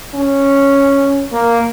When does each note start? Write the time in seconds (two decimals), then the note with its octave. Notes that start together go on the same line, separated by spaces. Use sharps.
0.14 C#4
1.32 A#3